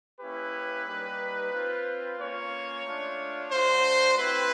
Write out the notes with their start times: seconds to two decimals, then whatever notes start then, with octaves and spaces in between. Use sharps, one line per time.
0.20 A#3 C#4 E4 G4 B4
0.86 G3 A#3 D#4 G4
1.53 C4 F4
2.18 A#3 C#4 F4 C#5
2.86 A3 D4 F4
3.51 A3 D4 F#4 C5
4.17 A3 C4 E4 G4 B4